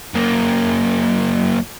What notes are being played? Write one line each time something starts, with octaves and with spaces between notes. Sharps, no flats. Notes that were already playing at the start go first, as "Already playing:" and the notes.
F#2 A#3